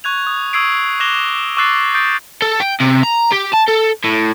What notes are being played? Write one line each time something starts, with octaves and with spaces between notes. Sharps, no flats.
C#6 F#6 G#6 F7
D#6
C#6 D#6 E6 G#6 C7 D7
D6 F#6 A#6 E7 F7 G7
C#6 D6 E6 F#6 A6 C7
D#6 G6 A6 C7 D7
A4
G5
C3
A#5
G4
A5
A4
A2